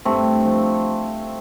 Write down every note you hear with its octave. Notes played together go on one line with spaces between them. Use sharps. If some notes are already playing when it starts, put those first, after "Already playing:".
G2 A3 C4
F3